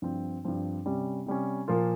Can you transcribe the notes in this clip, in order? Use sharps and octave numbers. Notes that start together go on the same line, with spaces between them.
G2 F3 C4
G2 F3 C4
C3 G3 C#4
C3 G3 C#4
A#2 F3 A#3 F4